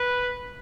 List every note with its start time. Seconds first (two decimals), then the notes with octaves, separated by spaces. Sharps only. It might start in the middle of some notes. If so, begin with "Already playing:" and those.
Already playing: B4